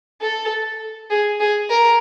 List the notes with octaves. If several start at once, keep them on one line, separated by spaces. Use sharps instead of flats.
A4
G#4
G#4
A#4